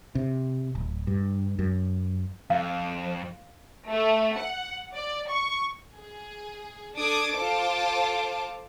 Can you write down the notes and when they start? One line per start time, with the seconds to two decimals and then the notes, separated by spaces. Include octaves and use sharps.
0.15 C3
0.75 D1
1.07 G2
1.59 F#2
2.50 F2 F5
3.88 A3
4.37 F#5
4.94 D5
5.28 C#6
5.96 G#4
6.96 D4 A4 D6 D#6 G#6 D7
7.34 F4 A4 C5 A5 D6